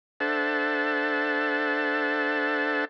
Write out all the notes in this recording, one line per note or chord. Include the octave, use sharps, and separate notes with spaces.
D4 A4 C5 E5 F#5 A5